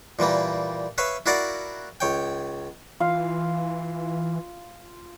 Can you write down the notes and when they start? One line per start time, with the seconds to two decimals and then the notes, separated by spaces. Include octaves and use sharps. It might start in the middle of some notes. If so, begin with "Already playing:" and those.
0.19 A#2 E3 G3 A#3
0.98 B4 C#5 E5 F5
1.26 E4 F#4 A#4 D5 F5 F#5
2.00 C#2 C#5 G5
3.00 E3 F4 F5